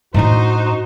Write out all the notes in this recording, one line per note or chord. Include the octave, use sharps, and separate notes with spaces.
A2 D4 D#4 F#4 C5